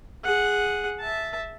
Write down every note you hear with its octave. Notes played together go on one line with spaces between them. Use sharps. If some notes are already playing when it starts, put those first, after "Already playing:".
G#4 F#5
E5 A5